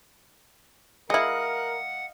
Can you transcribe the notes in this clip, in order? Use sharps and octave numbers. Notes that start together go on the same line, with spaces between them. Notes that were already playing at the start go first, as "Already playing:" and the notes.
G#3 E4 A#4 D#5 F5 F#5